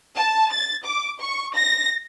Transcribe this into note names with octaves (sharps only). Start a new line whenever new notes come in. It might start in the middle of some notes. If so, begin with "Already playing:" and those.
A5
A6
D6
C#6
A#6